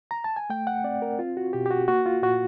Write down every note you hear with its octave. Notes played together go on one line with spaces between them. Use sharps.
A#5
A5
G#5
A3 G5
F#5
C4 D5
A#4
C4 F4
F#4
B2 G4
G4
F#4
A#3 F#4
F4
A#2 F#4